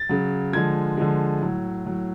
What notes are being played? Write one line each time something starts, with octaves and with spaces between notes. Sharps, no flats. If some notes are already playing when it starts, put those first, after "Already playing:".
Already playing: A6
C#3 F#3
D3 F3 G#3 G#6
D3 F3 G#3
A2 F#3
A2 F#3